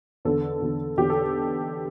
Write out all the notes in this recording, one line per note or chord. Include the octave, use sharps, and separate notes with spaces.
E2 D3 A4
E2 D3
E2 D3 G4
A4